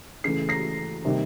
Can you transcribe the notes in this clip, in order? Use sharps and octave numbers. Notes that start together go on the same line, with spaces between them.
C#3 E3 A3 C7
A#6 C7
C3 D#3 G3 A#3 D#4